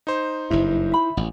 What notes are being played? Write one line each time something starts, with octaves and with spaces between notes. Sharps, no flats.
D#4 C5
F#1 G2 E4
E5 B5
A1